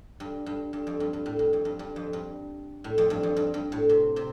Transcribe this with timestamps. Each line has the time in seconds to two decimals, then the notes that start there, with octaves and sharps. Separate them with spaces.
0.20 G2
0.46 G2
0.73 G2
0.87 F2
1.00 G2
1.13 G2
1.26 A2
1.39 G2
1.53 F2
1.65 G2
1.79 G2
1.96 F2
2.13 G2
2.84 A2
2.98 F2
3.10 G2
3.23 F2
3.37 G2
3.54 G2
3.72 A2
3.89 C3
4.16 C3